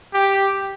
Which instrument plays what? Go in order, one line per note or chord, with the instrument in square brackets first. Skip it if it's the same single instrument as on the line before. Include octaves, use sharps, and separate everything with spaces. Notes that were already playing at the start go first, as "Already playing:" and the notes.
[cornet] G4